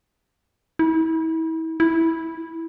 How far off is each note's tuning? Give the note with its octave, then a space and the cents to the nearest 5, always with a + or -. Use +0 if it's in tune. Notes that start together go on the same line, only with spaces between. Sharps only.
E4 -35
E4 -10